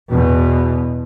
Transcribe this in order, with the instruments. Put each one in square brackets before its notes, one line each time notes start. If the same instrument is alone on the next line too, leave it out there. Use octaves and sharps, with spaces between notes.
[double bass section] E2 B2